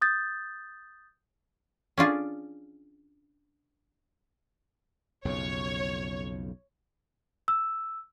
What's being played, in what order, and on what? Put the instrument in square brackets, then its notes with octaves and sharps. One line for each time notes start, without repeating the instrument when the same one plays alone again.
[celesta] D#6 G6 A6
[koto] C#4 D4 F4 G#4
[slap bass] B1 F2 C#3 [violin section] C#5
[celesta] E6